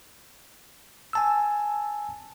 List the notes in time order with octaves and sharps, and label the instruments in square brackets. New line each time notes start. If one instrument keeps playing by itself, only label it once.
[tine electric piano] G#5 A5 E6